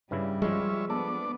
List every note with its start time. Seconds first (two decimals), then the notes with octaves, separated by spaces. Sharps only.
0.11 G2 C#3 G3 E4
0.42 F3 G#3 F4 C#5 E5
0.90 B3 D4 A4 D5